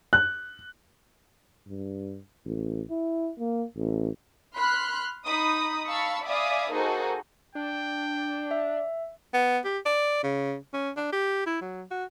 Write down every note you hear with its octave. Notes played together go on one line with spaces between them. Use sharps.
F#6
G2
A1
E4
A#3
A1
B5 C6 F6 F#6
D#4 B5 D#6
F5 A5 B5 C#6 E6
D5 E5 F5 G#5 B5 D#6
A#3 D#4 F#4 G#4 A4 C5
D4 G5
E5
B3
G4
D5
C#3
C#4
D4
G4
E4
F#3
F#4